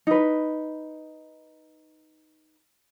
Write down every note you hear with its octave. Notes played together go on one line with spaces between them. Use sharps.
D#4 B4